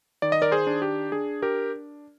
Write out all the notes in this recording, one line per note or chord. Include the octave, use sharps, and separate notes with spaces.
D#3 D5
D#5
A#4 D5
G#4 C5
D4
G4
D4 G#4
G4 A#4